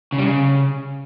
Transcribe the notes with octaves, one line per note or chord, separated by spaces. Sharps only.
C#3
G3
C#3